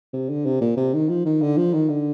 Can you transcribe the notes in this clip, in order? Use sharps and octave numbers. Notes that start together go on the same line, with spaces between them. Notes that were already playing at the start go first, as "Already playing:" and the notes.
C3
D3
C3
A#2
C3
D#3
F3
D#3
D3
F3
D#3
D3